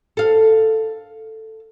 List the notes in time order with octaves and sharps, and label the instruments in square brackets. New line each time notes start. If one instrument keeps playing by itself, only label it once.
[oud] A4 F5